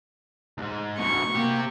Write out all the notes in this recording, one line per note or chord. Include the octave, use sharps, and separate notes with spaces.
D2 G#2
D2 B2 C#6
A#3 C4 G4